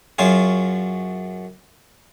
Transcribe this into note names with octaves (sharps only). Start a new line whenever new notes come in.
F#2 F#3 F4 G#4